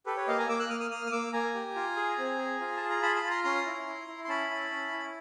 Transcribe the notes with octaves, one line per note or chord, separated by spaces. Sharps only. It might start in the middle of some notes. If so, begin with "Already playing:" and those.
G4 A4 B4
B4 C#5
A#3 D#5 F5
G#5 A#5
A#3 D6 E6
E6 F#6
A#3 D#6 F6
D#6 F6
A#3 D#6 F6
D#6
A#3 D6 E6
A#3 G#5 A#5
G4
F4
G#4
C4
G#4
F4
G#4 A5
A#5
F4 A5 B5
A5 B5
F4
A#5 C6
C#4 A#5 C6
E4
E4
E4
C6
C#4 A5 B5
E4
C#4
E4